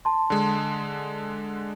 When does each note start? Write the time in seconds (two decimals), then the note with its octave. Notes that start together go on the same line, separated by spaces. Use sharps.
0.05 A5 C6
0.30 D3 G#3